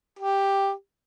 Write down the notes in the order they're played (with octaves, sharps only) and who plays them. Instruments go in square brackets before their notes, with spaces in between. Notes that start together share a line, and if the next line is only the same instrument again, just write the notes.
[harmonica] G4